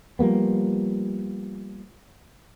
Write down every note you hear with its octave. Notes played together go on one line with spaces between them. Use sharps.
F3 G3 A#3 B3